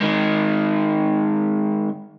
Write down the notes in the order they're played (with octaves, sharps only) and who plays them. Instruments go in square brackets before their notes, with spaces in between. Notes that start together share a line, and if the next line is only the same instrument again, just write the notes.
[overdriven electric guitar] D#3 G#3